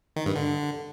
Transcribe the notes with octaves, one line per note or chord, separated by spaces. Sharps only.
D#3
G2
D3